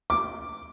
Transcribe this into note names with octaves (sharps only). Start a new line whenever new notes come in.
D6